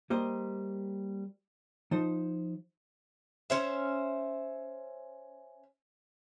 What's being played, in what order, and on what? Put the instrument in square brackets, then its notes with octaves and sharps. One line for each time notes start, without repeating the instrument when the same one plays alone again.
[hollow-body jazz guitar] G3 A#3 C5 D#5
F3 D#4 C5
[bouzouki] C#4 C5 E5